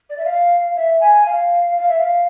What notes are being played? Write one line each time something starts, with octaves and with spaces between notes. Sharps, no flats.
D5
E5
F5
E5
G#5
F5
F5
E5
F5